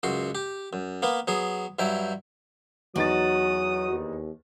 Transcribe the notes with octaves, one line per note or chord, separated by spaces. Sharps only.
C#2 F#2 F#4 C6
G4
F#2
A#3 B3 B4
F#3 B3 G#4
G2 F#3 E4 G5
E2 F#3 D#4 F#4 D#6 A6
D#2